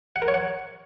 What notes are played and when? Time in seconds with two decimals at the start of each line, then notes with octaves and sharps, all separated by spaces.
0.16 F#5
0.22 A#4
0.28 C#5
0.34 F#5